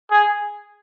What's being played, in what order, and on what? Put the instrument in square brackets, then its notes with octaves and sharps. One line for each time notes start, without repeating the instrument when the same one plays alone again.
[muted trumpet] G#4